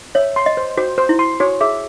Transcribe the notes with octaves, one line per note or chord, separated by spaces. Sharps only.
C#5 E5
C6
D#5
C5
F#4 C5
C5
E4
C6
F#4 C#5
G#4 E5